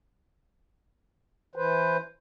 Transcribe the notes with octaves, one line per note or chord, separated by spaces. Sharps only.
E3 B4 C5